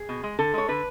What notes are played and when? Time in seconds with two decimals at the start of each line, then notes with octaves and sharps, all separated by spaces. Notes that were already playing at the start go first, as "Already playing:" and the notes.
Already playing: G#4
0.09 B2
0.23 G#3
0.39 D3 A4
0.54 G#3 C#5
0.68 D3 B4